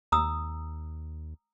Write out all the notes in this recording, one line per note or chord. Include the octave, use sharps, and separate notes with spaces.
D#2 A#5 D#6 E6